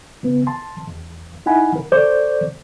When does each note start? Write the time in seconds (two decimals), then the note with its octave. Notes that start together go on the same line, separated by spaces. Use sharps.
0.23 C#3 B3
0.47 A5 C6
0.87 E2
1.46 D#4 E4 F#5 G#5 B5
1.76 A#4
1.92 A4 C5 D5 C#6 D6 G6